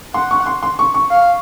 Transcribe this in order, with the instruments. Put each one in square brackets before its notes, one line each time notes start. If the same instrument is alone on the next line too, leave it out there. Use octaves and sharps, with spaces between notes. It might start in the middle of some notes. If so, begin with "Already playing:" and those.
[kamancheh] F#5 [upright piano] C6
[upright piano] C#6
C6
C6
C#6
C#6
[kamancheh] F5